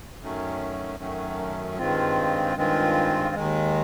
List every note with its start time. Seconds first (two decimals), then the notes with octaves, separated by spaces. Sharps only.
0.21 F#2 D#3 F#3 A3 C#4
0.99 F#2 D#3 F#3 A3 C#4
1.78 G2 D#3 G#3 C4 F4
2.56 G2 D#3 G#3 C4 F4
3.35 D#2 D#3 G#3